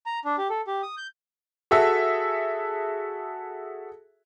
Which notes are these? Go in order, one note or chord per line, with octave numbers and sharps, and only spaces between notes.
A#5
D4
G4
A4
G4
D#6
G6
F#4 G#4 A4 E5